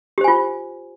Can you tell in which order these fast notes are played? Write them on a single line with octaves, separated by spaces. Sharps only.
G4 C5 G#5 F4